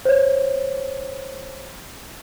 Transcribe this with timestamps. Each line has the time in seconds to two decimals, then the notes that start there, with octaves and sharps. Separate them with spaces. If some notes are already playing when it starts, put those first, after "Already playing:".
0.05 C5 C#5